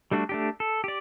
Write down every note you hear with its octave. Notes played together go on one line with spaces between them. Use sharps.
G3 A3 D4 F#4
A3 D4 G4
A4
G4 D5